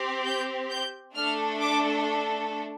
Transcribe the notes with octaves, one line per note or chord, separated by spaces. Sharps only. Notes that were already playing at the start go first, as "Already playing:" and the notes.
Already playing: C4 G4
G6
G6
A3 D4 A4 F6
D6